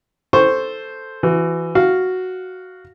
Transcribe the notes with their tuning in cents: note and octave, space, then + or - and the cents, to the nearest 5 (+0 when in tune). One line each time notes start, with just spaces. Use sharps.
A4 +0 C5 +0 C#6 -5
E3 +15 F#4 +0
F#4 +0 F5 +0